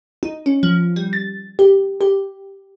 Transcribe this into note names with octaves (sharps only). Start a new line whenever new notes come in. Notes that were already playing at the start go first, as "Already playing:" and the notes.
D#4
C#4
F3
G3
A6
G4
G4